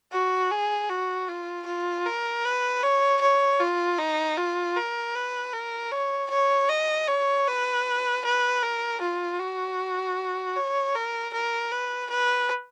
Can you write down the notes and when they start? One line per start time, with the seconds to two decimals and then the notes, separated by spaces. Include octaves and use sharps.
0.12 F#4
0.51 G#4
0.90 F#4
1.29 F4
1.67 F4
2.06 A#4
2.45 B4
2.83 C#5
3.21 C#5
3.60 F4
3.98 D#4
4.37 F4
4.76 A#4
5.15 B4
5.53 A#4
5.92 C#5
6.30 C#5
6.69 D#5
7.08 C#5
7.47 B4
8.25 B4
8.63 A#4
9.01 F4
9.40 F#4
10.56 C#5
10.95 A#4
11.34 A#4
11.72 B4
12.10 B4